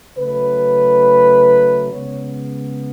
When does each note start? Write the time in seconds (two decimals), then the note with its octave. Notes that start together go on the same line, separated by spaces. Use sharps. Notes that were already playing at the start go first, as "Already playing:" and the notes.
0.18 C#3 F#3 A3 B4
1.93 C#3 G#3 B3 C#5